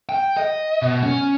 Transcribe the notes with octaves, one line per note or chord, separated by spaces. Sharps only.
G5
D#5
B2
C#4